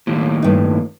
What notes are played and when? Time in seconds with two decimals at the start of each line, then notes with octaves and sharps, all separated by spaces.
0.07 D#2 A2
0.42 G2 D#4